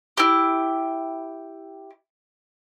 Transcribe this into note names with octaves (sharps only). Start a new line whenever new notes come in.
E4 G4